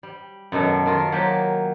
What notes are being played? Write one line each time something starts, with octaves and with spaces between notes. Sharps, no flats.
G3
F#2 B2 D#3 A4
D#3 F4 A#4
F#3 A#3 G4